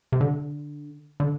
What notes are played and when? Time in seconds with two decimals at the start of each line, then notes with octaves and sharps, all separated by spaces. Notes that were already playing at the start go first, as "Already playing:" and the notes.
0.12 C3
0.21 D3
1.20 D3